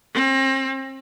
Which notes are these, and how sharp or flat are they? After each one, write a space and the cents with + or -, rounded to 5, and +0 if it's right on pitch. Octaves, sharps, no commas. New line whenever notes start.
C4 +40